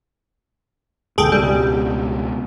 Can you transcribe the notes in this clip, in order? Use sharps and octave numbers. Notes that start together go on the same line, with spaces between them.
D2 G#2 B2 G#4 A4 G5
C#2 B2 G3